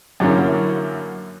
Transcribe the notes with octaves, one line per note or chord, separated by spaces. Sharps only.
F#2 D3 F#3 A#3 C#4 E4